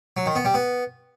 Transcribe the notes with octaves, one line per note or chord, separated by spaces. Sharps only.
F#3
D#3
B3
G3
B3